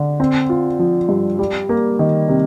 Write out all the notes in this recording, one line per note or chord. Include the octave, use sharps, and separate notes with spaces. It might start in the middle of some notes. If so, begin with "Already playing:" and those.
Already playing: D3
C4
F4
F3
G2
G3
A#3
D#3
C3